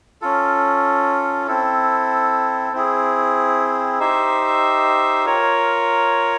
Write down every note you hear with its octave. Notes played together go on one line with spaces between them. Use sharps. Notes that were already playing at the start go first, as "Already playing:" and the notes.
C#4 F4 A4
C4 E4 A4
C4 E4 G#4
D#4 G4 C5 E5
F4 A#4 C#5